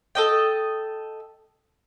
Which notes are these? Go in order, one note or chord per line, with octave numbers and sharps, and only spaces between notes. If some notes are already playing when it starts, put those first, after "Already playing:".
A4 D#5 G5